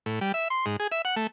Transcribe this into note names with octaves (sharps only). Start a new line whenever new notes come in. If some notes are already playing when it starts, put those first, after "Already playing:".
A2
G3
E5
C6
G#2
G#4
E5
F#5
A3